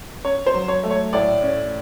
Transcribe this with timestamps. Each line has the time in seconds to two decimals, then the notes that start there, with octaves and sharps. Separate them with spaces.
0.24 C#4 C#5
0.46 C5
0.54 F#3
0.68 C#5
0.84 A3
0.91 C#5
1.13 A2 D5
1.43 C#4